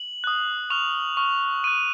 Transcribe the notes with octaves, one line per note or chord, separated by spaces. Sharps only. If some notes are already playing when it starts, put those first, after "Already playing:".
Already playing: F#7
D#6 F#6
C#6 F6 F7
C#6 F6
D#6 F#6 D#7